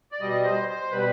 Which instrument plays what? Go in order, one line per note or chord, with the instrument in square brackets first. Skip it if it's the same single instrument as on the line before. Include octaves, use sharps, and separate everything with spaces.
[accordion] D5
B2 G3 D#5
C5
C5
B2 G3 B4